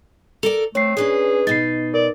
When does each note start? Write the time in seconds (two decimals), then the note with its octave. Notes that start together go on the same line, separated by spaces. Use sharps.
0.43 A4 A#4 D5 F7
0.75 A3 C4 C#5 C7
0.97 C#4 D4 G#4 B4
1.47 B2 D#4 A6 C7
1.94 A#4 D5